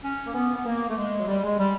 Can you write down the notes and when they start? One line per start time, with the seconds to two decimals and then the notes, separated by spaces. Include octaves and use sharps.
0.03 C#4
0.26 A#3
0.34 B3
0.55 B3
0.66 A#3
0.89 A3
0.96 G#3
1.19 F#3
1.27 G3
1.43 G#3
1.59 G3